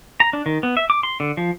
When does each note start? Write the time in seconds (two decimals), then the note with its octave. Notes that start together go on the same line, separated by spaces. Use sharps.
0.20 A#5
0.33 D4
0.46 D#3
0.63 B3
0.77 E5
0.90 D6
1.03 C6
1.20 D3
1.37 F3